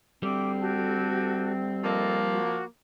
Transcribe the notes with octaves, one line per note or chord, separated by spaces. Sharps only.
D2 G3 C4 D6
F#4 G4 A4
F3 A#3 A4 D#5
F#4